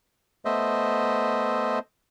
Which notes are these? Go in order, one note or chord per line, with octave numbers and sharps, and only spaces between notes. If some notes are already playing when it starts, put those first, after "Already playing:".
A3 B3 C5 D#5 E5